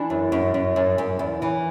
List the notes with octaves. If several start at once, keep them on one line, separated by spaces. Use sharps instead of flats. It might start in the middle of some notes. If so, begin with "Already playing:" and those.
Already playing: E3 D4
F#2
F#2
F#2
F#2
F#2
E2
E3